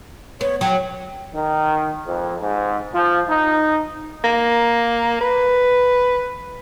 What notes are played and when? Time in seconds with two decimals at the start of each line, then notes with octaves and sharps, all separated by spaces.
0.41 B3 C#5
0.61 F#3 G5
1.35 D#3
2.06 F2
2.41 G#2
2.95 F3
3.29 D#4
4.24 A#3
5.21 B4